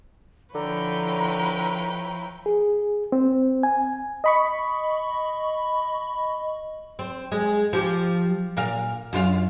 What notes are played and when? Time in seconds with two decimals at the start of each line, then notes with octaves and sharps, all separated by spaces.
0.55 D3 F3 E4 B4 C#5 G5 A#5
2.46 G#4
3.12 C4
3.63 G#5
4.24 D#5 B5 C#6
6.99 C4
7.32 G#3
7.73 F3 G4
8.57 A#2 A#4 F5
9.13 F#2 F4 F5